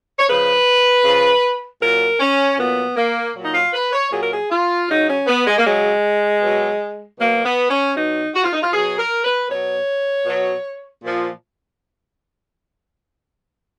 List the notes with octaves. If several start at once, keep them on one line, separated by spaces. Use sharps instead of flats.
C#5
C#3 F3 B4
C#3 F3
A#2 F#3 A#4
C#4
A#2 F#3 B3
A#3
A#2 F#3
D#4
F4
B4
C#5
A#2 F#3 G#4
A#4
G#4
F4
C#3 F#3 D#4
C#4
B3
G#3
A#3
C#3 F#3 G#3
B2 F#3
B2 F#3 A#3
B3
C#4
B2 F#3 D#4
F#4
F4
D#4
F4
B2 F#3 G#4
A#4
B4
B2 F#3 C#5
B2 F#3
A#2 F3